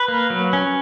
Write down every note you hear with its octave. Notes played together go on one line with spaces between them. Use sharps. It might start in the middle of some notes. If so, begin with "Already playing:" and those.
Already playing: B4
A#3
F#3
C#4